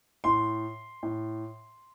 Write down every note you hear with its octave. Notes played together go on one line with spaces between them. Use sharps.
A2 C6
A2